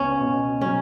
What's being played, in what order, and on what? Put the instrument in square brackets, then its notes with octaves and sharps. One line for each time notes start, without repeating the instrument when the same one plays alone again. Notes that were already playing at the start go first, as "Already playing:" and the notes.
Already playing: [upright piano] C#2 B3 [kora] C#4
[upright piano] B2
[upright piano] F#3 [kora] C#4